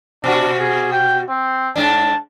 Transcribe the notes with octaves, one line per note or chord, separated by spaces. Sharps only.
B2 D4 F#4
G#4
G5
C4
G#2 D4 A5